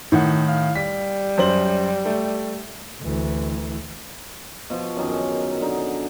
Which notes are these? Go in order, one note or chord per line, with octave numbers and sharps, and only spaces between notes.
A2 D#3 F#5
F5
G3 B6
F#2 C5 F#7
A3
D2 E3
B2 F3
F#2 D#3 G#4
D3 D#4